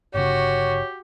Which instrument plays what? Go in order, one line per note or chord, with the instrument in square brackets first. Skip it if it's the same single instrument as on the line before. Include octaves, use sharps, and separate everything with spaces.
[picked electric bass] G1 C#3 [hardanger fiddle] F#4 [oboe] G4 [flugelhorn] C#5